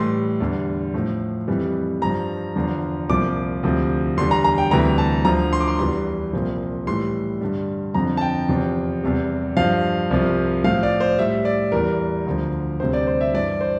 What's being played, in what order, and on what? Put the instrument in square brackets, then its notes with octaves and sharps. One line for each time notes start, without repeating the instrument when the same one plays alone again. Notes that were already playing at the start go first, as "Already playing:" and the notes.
Already playing: [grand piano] A2 E3 G3 C6
E2 D3 G3
A2 F3
F2 E3 G3
G2 F3 A#5
E2 D3 F3
C2 A#2 F3 D6
D2 C3 F3
E2 D3 G3 C6
A#5
A#5
G5
D2 C3 E3 G3 A#5
A5
D2 D3 F3 A#5
C6
D6
C6
E2 E3 G3 C6
C2 A#2 F3
A2 E3 G3 C6
G2 D3 G3
F2 D3 F3 A#5
A5
G5
E2 C3 F3
E2 C3 G3
G2 F3 F5
C2 C3 F3
A2 F3 F5
D5
C5
A2 G3 E5
D5
E2 E3 G3 A#4
D2 D3 F3
D2 C3 G3 C5
D5
C5
E5
G2 E3 G3 D5
C5